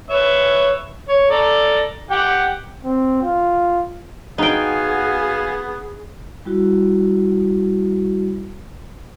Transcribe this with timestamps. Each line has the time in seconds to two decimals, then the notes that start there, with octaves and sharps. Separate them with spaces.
0.10 B4 C#5 E5
1.09 C#5
1.30 A4 D5 A#5
2.11 G4 F#5 G5
2.84 C4
3.23 F4
4.38 B3 D#4 F#4 G#4 F5 G5 G#5
6.45 G3 E4 F#4